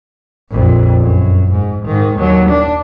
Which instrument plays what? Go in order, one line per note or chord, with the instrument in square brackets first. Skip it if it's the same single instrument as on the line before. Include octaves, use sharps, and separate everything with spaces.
[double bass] A#1 F2
F#2
G#2
G#2 D#3
D#2 F#3
D4